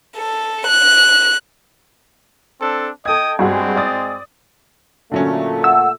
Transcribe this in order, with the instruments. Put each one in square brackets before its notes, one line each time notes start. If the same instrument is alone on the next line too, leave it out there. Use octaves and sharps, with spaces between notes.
[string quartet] A4
F#6
[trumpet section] C4 D4 A4
[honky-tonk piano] A4 G#6 [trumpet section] D#5 G5 D#6
[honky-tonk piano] G2 F#4 G#4 [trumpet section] G#3 C4
[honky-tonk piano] D5 D#6 A6
[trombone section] A#2 A3 [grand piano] D3 F#3 C#4
[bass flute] F#5 [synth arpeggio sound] E6